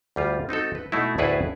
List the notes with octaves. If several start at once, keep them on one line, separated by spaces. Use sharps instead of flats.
D2 G3 F4
C4 D#4 F#4 A4
B4
B2 A3 D#4 E4
D2 A2 E4 G#4 A4 B4